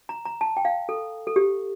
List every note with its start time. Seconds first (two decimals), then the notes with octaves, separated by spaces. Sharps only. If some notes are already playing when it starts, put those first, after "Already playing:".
0.09 A#5
0.25 A#5
0.41 A5
0.57 G5
0.65 F5
0.89 A4
1.27 A4
1.36 G4